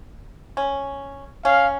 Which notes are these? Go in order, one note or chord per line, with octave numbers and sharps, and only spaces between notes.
C#4
C#4 F5